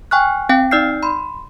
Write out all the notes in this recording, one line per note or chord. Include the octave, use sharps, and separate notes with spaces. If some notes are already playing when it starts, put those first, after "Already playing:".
G5 G#5 C#6 F6 F#6
C4 F5 G5
D#4 D5 E6 F6 G6 C7
B5 C6